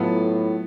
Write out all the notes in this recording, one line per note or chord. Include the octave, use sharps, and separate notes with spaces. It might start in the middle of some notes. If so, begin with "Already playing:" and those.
Already playing: A2 F#3 B3 F4 A4